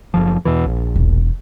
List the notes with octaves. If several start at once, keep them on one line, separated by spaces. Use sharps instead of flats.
F#1 F3
E2 B2 E3
A#1
E1 F3